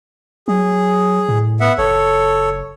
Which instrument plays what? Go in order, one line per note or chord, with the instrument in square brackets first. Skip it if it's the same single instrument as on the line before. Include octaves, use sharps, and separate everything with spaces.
[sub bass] F#3 [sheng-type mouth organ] G#4
[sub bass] A2
[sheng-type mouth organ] B3 E5 F#5
[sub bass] F#1 [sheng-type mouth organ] A4 C#5